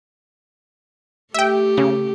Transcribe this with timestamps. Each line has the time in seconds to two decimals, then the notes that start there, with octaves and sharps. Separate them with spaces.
1.34 A3 G4 E5 G5
1.77 C#3